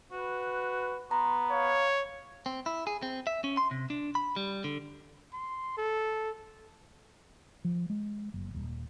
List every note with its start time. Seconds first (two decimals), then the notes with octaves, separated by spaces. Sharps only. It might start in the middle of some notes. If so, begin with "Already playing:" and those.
0.12 F#4 B4
1.11 B3 A#5 C6
1.51 C#5 F5
2.46 C4
2.66 E4
2.87 G#4
3.02 C4
3.27 E5
3.44 C#4
3.57 C6
3.71 C3
3.90 D4
4.15 B5
4.36 G3
4.64 D3
5.33 C6
5.77 A4
7.65 F3
7.90 G#3
8.34 F#1
8.54 D#1